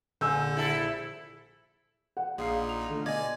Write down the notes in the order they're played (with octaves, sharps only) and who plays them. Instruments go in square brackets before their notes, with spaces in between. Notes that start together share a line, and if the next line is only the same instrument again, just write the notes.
[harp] A#1 [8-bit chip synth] D3 [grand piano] G#5 E6 G6
[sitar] E4 A4
[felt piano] F#5
[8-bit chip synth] A#1 A#2 [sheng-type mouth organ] D#4 F4 [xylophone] G#4 F5
[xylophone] F7
[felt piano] D3 A3
[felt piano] B2 [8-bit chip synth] D5 G#5 [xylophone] D#5 G#6